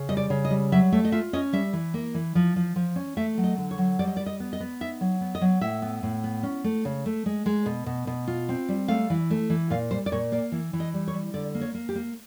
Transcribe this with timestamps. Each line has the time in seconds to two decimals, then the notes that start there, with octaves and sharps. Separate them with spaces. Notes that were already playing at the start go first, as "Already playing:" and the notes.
Already playing: C#3
0.09 G3 D#5
0.17 D5
0.30 C#3
0.45 D#5
0.51 G3
0.72 F#3 E5
0.92 A3 E5
1.05 D#5
1.12 F4 E5
1.33 C#4 D#5
1.53 G3 E5
1.73 E3
1.94 A#3
2.14 E3
2.35 F3
2.56 F3
2.76 F3
2.96 C#4
3.17 A3 E5
3.38 F#3
3.44 D#5
3.58 D3
3.71 C#5
3.78 F#3
3.99 G3 D5
4.07 D#5
4.17 D5
4.20 G3
4.26 D#5
4.40 B3
4.53 D#5
4.60 B3
4.81 D#4 E5
5.01 F#3
5.21 B3
5.35 D#5
5.41 F#3
5.61 A2 E5
5.82 B3
6.03 A2
6.24 B3
6.43 C#4
6.64 A3
6.85 C#3
7.06 A3
7.26 G#3
7.46 G#3
7.66 B2
7.86 B2
8.07 B2
8.27 F4
8.49 C4
8.69 G3
8.88 A3 F5
9.10 E3
9.30 A3
9.50 E3
9.70 A#2 F5
9.91 G3 C5
10.06 D5
10.12 A#2 C#5
10.32 A#3 D5
10.52 E3
10.73 E3
10.80 D#5
10.94 G3
11.08 C#5
11.14 G3
11.34 D3 D5
11.55 A#3
11.61 C#5
11.74 A#3
11.89 G4
11.95 A#3